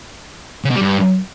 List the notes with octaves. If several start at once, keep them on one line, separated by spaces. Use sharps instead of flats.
C#3
B2
G3
G2